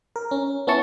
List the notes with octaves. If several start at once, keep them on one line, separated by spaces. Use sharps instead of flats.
A#4
C#4
B3 C#4 E4 A5 C#6